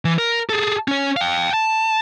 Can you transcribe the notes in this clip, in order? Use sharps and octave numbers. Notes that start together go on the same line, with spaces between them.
E3
A#4
G#4 A4
C#4 C#5
F5 G5
A5